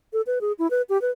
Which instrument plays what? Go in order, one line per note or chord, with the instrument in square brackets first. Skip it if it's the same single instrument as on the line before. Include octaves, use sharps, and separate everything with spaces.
[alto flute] A4
B4
G#4
E4
B4
G4
B4